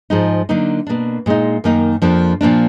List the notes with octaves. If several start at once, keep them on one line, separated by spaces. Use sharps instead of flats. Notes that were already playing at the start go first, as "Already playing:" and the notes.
G#2 F3 G#3 D#4
D3 F#3 A#3 D#4
B2 A#3 D4
A#2 G#3 D#4
F#2 D#3 A#3 D#4
F2 F3 A#3 D4
A#2 F3 A#3 D4